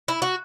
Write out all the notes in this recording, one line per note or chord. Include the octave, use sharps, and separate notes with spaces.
E4
F#4